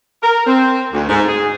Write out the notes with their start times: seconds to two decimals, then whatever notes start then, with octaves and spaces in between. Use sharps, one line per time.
0.23 A#4
0.46 C4
0.93 D2
1.09 G#2
1.28 G#4